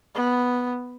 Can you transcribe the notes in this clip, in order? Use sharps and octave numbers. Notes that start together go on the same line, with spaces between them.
B3